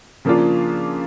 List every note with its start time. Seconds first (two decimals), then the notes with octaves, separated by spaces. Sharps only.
0.25 C#3 F3 A#3 D4 F4